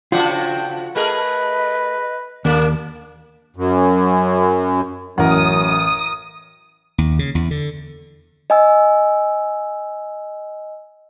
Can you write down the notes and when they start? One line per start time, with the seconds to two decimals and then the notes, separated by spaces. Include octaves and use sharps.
0.12 C#3 F3 F4 F#4 D5 G5
0.95 A3 G#4 A#4 B4 D#5
2.45 D#2 C#3 A#3 D4 A#4
3.56 F#2
5.18 A1 F#2 A#4 F#5 D#6
6.98 D#2
7.19 C#3
7.35 E2
7.51 D3
8.50 D#5 G#5 E6